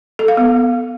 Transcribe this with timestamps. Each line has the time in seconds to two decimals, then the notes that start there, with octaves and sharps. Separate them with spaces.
0.19 A4
0.28 F5
0.37 B3